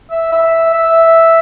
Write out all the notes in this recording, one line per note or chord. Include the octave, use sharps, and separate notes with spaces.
E5
E5
E5